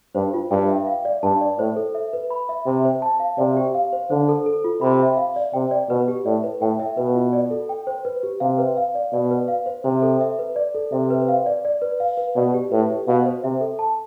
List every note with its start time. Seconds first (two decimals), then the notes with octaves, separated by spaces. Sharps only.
0.15 G2 C5
0.34 F4
0.51 G2 G5
0.69 E5
0.87 F5
1.05 D5
1.23 G2 A5
1.41 D5
1.58 A2 C5
1.76 A4
1.95 E5
2.13 B4
2.30 B5
2.49 E5
2.66 C3 E5
2.85 C5
3.02 A5
3.20 F5
3.38 C3 D5
3.57 G4
3.74 F5
3.93 C5
4.10 D3 C5
4.29 A4
4.46 A4
4.64 F4
4.81 C3 B5
4.99 E5
5.17 F5
5.36 D5
5.54 C3 G5
5.71 D5
5.90 B2 B4
6.08 G4
6.25 A2 D5
6.44 B4
6.61 A2 G5
6.79 E5
6.97 B2 B4
7.15 F4
7.33 D5
7.51 A4
7.69 G5
7.87 C5
8.05 B4
8.23 G4
8.40 C3 F5
8.58 B4
8.77 F5
8.95 D5
9.13 B2 D5
9.31 B4
9.48 F5
9.66 C5
9.84 C3 C5
10.02 A4
10.21 E5
10.39 B4
10.56 D5
10.75 A4
10.92 C3 E5
11.10 B4
11.28 F5
11.46 D5
11.65 D5
11.82 B4
12.00 F5
12.17 B4
12.36 B2 D5
12.54 G4
12.72 A2 B4
12.89 G4
13.08 B2 F5
13.26 C5
13.44 C3 E5
13.61 A4
13.79 A5